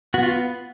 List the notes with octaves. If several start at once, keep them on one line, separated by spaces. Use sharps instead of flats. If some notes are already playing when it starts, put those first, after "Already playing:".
B3 F#4
F4